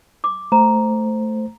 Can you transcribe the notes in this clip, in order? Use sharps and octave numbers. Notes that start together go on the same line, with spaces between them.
D6
A3 C5 A#5